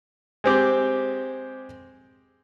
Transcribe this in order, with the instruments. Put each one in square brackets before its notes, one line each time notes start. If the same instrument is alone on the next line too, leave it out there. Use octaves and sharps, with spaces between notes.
[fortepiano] G#3 C4 G4 D6